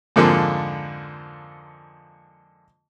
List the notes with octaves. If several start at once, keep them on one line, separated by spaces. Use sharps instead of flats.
F2 G#2 D3 F3 A#3